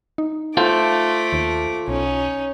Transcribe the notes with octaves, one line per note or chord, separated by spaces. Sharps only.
D#4
A3 F4 A4 C5 D6
D#2
B1 C#4 D#4